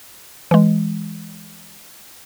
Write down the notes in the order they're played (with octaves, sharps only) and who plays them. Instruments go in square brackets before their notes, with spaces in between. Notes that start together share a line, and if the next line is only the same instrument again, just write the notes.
[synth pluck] E3 G#3